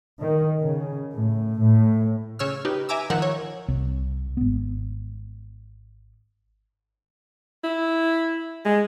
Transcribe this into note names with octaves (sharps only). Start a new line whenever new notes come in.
D#3
C#3
A2
A2
C#3 C#5 E6 F6
D#4 G4 B4
E5 G#5 A#5 D6 E6
D#3 F3 A#4 F#5 E6
C#5
C2
G#1 B3
E4
G#3